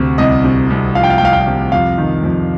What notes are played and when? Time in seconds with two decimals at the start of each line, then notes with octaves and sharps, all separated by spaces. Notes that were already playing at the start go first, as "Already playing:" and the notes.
Already playing: D2 C3
0.18 C2 D#5
0.44 C3
0.70 C2
0.95 F3 F5
1.04 G5
1.10 F5
1.18 G5
1.21 C2 F5
1.33 G5
1.40 F5
1.47 C3
1.72 F2 F5
1.98 D#3
2.24 F2